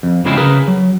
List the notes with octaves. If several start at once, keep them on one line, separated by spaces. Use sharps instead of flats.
F2
C#2 C#3 F3 G#3 C4 E4
C#3 G#4 A#4 B4
F#3